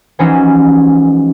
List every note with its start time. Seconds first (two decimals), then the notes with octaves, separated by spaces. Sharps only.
0.19 E3 F3 G#3 C#4 D#4 F#4